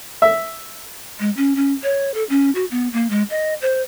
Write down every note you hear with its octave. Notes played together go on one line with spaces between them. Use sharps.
E5
G#3
C#4
C#4
C#5
A4
C#4
F#4
B3
A#3
G#3
D#5
C5